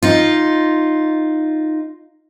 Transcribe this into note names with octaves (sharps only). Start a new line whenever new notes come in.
D#4 F4